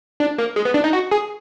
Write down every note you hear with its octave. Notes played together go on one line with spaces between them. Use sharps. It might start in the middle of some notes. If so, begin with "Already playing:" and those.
D4
A#3
G#3
B3
D4
D#4
F#4
G#4